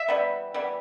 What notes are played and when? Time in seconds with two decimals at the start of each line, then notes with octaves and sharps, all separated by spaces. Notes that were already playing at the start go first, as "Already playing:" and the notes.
Already playing: E5
0.08 E3 G3 B3
0.54 E3 G3 B3